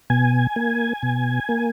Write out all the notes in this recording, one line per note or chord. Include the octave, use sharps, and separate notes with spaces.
B2 G#5
A#3
B2
A#3